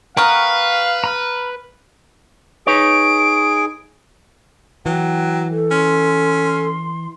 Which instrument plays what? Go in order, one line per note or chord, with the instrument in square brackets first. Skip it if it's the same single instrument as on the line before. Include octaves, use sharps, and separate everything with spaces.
[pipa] B3 A#4 [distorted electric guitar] B4 [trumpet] F5 [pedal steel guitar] G5 C#6 F6
[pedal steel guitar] A#5 B5 F6
[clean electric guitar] D#4 B4 C#5 [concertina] G#4 [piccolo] D7
[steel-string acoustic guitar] E3 [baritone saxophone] F#3 [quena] G5
[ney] A4
[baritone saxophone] C#4 [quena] C6